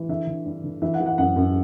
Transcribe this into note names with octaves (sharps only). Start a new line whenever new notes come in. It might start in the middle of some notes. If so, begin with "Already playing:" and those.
Already playing: E3
D3 E5
D3
G2
D3
E3 E5
F#5
E3
F#5
F#2 F#5
F#2